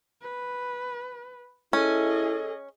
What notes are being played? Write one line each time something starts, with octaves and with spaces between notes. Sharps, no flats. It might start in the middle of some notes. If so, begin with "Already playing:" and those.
B4
C#4 E4 G#4 A4 D#5